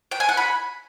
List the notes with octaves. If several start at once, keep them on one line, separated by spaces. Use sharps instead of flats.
G5
G#5
F#5
B5